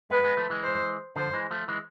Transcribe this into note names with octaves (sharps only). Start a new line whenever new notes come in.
G#3 B3 B4
G#3 B3
F3 A3
E3 G#3
C5
D3 F3 C5
E3 G#3
F3 A3
E3 G#3